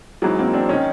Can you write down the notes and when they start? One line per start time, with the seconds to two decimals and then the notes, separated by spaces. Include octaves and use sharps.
0.22 G#1 G#2 E3 F#3 G#3
0.39 A#3 C4
0.54 C4 D4
0.69 D#3 C#4 D#4